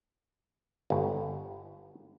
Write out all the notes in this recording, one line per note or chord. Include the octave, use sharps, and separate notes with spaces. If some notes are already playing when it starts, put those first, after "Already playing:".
G1